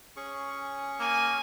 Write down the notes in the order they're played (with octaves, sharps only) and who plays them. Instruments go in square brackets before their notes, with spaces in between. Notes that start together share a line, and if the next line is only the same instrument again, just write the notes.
[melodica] C#4 G#4 C#6
[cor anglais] A#3 [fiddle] G#5